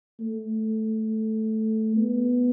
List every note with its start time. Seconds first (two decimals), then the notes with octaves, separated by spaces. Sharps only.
0.20 A3
1.96 B3